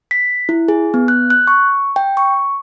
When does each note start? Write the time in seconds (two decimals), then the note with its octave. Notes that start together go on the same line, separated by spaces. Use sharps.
0.11 B6
0.49 E4
0.68 G#4
0.94 B3
1.08 F#6
1.30 F#6
1.47 C#6
1.96 G5
2.17 C#6